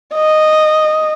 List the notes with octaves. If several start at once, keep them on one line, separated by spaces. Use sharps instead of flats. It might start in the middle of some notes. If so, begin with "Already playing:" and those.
D#5